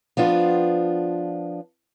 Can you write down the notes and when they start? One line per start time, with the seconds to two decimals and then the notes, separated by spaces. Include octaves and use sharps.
0.17 F3 B3 D4 F4